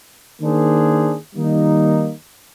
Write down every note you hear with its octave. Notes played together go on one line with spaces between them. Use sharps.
D#3 A#3 D4 G#4 C5
D#3 G3 A#3 D#4